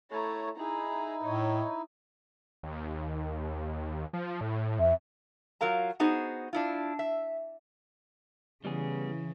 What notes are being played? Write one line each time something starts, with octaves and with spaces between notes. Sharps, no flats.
A3 E4 C#5 A#5
D#4 E4 G#4 A#5
A2 C#5 D#5
D#2
F3
A2
F2 E5
F#3 F4 A#4 F5 A#5
B3 D#4 F#4 G#4 C5
D4 E4 F4
E5
C#3 E3 G3 B3 G#4